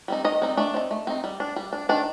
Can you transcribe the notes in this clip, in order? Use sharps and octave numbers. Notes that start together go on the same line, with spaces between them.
G3 C4 D#4
D#3 D#4 D#5
G3 C4 D#4
A3 D4 D5
C4 D#4
A3
C4 D#4
G3
D4
G3
D4
D#3 D4 D5